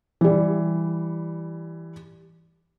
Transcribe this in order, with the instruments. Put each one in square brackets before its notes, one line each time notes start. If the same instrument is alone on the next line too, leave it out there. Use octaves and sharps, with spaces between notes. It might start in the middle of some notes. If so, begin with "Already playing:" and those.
[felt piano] E3 G3